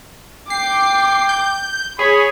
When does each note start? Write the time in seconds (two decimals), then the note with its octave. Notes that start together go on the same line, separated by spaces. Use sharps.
0.50 G5 D6 C7
1.29 G6
1.99 G#4 C#5 B5